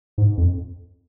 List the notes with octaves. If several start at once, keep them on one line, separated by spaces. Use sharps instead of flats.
G#2
F2